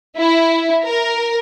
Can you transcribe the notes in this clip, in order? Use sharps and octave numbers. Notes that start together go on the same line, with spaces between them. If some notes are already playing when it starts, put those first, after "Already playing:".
E4
A#4